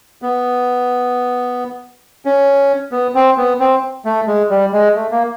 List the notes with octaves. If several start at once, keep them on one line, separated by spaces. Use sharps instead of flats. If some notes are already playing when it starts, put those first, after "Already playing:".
B3
C#4
B3
C4
B3
C4
A3
G#3
G3
G#3
A3
A#3